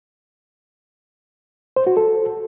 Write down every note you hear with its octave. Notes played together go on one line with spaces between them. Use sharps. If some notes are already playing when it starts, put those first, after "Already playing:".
C5
F#4
A4